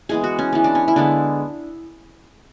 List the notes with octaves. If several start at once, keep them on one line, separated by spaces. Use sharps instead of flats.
E3 G#3 B3 G#4
F#4
C#4
E3 G#3 B3
D4
C#4
E4
D3 G#3 B3 D4